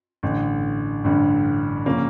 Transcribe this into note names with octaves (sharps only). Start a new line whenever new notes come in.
A1 G2 D3
A1 G2 D3
C#3 F3 A#3 C#4